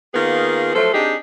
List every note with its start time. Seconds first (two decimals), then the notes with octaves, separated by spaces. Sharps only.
0.14 D#3 A#3 B3 F4 G#4
0.75 F3 F#3 A3 A4 C5
0.93 C4 D4 D#4 G4 G#4